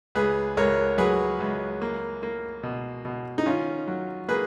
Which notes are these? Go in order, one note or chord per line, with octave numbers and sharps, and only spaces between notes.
C#2 G#4 B4
C#2 A#4 C#5
F#3 G#4 B4
C#2
A#3
A#3
B2
B2
D#4
D#3 C#4 F4
F#3
A#3 G#4 B4